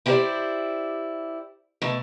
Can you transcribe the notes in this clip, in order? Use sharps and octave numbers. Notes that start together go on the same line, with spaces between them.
E4 G4 G#4 B4 C5 D5
B2 A3